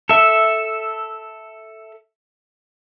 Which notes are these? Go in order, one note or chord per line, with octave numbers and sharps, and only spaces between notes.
A4 E5